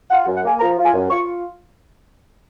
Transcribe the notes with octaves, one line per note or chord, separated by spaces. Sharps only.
F4 F#5
F#5
F#2
F#5
A#3 G#5
F3 A#5
F4
G#5
F#2
F4 C#6